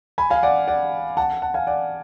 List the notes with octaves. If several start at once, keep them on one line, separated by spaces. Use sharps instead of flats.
G#5 B5
F5 G#5
D5 F#5
D5 F#5
F#5 A5
F#5 A5
F5 G#5
D5 F#5